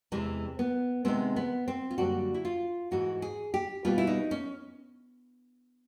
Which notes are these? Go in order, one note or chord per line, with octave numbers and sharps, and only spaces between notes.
E2 C3 E3 G#3 C4
B3
C3 D#3 G#3 B3 C4
B3
C4
F4
F#2 D3 G3 A#3 F#4
E4
F4
G#2 E3 A3 F#4
G#4
G4
B2 G3 B3 F4
E4
D#4
C#4